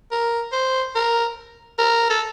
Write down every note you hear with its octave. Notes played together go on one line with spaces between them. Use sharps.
A#4
C5
A#4
A#4
A4